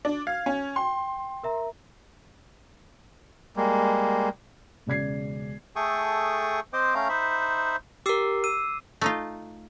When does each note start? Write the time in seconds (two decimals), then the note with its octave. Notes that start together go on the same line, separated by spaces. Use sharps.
0.05 D4
0.27 F5 G#6
0.46 C#4
0.76 G5 C6
1.43 A#4 E5 A#5
3.56 G3 G#3 A#3
4.86 E1 C#3 D5 G#6 C7
5.76 A3 G#4 A4 G5 C#6 D#6
6.73 C4 C5 D#5 G5 D6
6.95 A3 C#4 F5 G5 A#5
7.09 D#4 C5 E5 B5
8.06 G4 A#4 D6 E6 C7
8.44 E6 D#7
9.01 A3 D#4 F4